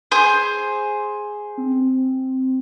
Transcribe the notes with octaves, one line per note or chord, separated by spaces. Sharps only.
G#4 C5
C4